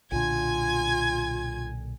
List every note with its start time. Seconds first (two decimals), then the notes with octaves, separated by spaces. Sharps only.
0.12 B1 A#2 D3 F4 G#5 G#6